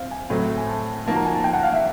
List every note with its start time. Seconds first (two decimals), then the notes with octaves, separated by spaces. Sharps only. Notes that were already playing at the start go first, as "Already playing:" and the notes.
Already playing: C4 F5
0.11 G#5
0.30 A2 F#3 A3 C4
0.58 G#5
0.68 A5
1.06 F3 A#3 D#4 F#4 A5
1.16 A#5
1.26 G#5
1.35 A5
1.44 G5
1.53 F#5
1.63 F5
1.73 E5